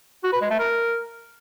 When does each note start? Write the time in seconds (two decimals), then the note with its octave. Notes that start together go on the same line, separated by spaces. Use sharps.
0.24 F#4
0.33 B4
0.41 G#3
0.50 A3
0.59 A#4